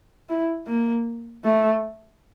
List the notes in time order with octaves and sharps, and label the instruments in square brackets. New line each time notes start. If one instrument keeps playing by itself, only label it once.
[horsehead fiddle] E4
A#3
A3